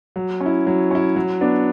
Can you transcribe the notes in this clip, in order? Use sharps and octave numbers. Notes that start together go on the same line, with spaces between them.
F#3
C#4
E4
F#3
C#4 E4
F#3
B3 D4